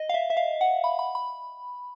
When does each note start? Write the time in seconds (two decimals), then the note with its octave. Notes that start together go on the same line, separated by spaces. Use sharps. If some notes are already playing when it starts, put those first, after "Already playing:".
Already playing: D#5
0.09 F5
0.14 E5
0.30 E5
0.37 F5
0.61 F#5
0.84 B5
0.99 B5
1.15 B5